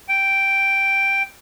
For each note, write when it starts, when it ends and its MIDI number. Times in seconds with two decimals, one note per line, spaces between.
0.09 1.23 79